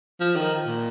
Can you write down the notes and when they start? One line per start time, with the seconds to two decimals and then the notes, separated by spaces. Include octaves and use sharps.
0.20 F3
0.36 D#3
0.67 A#2